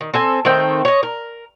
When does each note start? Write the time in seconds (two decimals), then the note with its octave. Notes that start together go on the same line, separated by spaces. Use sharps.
0.01 D#3
0.14 C4 A4 G#5
0.45 D#3 A3 C4 G5
0.85 C#5 D#5
1.03 A#4